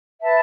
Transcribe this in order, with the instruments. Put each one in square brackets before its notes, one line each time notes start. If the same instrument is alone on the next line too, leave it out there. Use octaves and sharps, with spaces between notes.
[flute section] B4 E5 A5